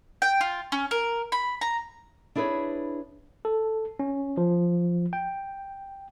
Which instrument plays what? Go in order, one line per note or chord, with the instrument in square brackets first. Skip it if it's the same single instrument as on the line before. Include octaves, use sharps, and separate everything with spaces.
[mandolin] G5
F4
C#4
A#4
B5
A#5
[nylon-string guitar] D4 E4 G#4 A#4 B4 C#5
[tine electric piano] A4
C#4
F3
G5